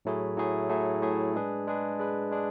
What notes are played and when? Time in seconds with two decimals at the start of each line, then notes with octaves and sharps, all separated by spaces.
0.05 A2 F#3 A3 E4 G#4
0.37 A2 F#3 A3 E4 G#4
0.69 A2 F#3 A3 E4 G#4
1.02 A2 F#3 A3 E4 G#4
1.34 G#3 D4 G#4 B4
1.67 G#3 D4 G#4 B4
2.00 G#3 D4 G#4 B4
2.31 G#3 D4 G#4